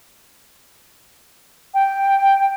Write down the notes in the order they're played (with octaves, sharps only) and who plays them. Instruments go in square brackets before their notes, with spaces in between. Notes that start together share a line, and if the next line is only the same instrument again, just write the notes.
[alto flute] G5